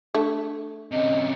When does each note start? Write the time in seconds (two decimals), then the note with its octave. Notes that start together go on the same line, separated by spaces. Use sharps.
0.14 A3 D4
0.92 C3 C#4 D#5